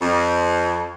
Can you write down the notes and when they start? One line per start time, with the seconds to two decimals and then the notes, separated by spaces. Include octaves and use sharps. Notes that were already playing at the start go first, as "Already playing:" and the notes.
0.02 F2